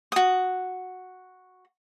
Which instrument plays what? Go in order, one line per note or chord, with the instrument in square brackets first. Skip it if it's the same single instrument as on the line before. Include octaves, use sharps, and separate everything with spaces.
[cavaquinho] F#4 D#6